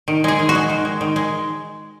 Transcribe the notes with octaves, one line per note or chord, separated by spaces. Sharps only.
D#3
G#3 G#4
D#3
F#4
G#3
D#3
G#3
D#3
G#3